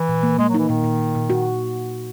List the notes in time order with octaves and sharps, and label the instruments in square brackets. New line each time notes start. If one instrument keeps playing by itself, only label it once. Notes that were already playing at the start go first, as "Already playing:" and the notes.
Already playing: [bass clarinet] E3
[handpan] A#2
A#3
[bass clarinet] G#3 [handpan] A#3
[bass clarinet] F#3
[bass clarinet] E3 [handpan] D#4
[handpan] A#2 [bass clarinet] D#3
[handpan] A#2
A#2
A#2
F#4